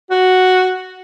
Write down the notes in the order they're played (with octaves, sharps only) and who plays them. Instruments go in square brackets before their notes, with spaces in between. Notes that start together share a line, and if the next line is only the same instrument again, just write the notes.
[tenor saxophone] F#4